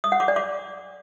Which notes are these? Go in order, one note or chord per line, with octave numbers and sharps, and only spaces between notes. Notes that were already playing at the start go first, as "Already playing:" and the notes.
D#6
F#5
D6
D5
D6